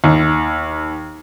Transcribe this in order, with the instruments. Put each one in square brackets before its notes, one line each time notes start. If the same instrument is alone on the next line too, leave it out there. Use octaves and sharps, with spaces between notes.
[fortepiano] D#2